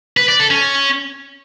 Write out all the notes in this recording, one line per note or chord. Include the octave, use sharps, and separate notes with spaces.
B4
D5
A4
C#4